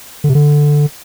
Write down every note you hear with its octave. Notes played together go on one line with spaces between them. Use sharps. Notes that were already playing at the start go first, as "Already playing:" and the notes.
D3
C3
D3